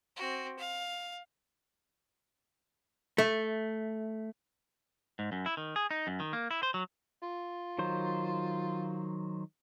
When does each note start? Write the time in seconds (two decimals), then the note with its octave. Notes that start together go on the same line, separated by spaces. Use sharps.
0.17 C4 F#4
0.59 F5
3.18 A3
5.19 G#2
5.32 F#2
5.46 E4
5.57 D#3
5.76 G#4
5.91 D#4
6.07 F#2
6.20 D#3
6.33 A#3
6.51 E4
6.63 C5
6.74 F#3
7.22 F4
7.78 D#3 F#3 C5